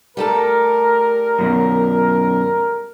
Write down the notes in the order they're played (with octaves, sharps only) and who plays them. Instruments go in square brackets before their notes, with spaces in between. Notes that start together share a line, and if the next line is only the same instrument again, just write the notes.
[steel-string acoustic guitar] G3 A3 A4 [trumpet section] A#4
[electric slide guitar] F#2 B2